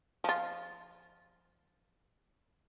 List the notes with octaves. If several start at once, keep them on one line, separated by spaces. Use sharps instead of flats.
F3 F4